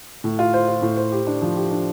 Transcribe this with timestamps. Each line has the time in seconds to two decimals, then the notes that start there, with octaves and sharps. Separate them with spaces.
0.24 A2
0.39 F4
0.54 C5
0.68 F4
0.82 A2
0.97 C5
1.12 G4
1.27 D4
1.42 F3
1.56 G4
1.71 D4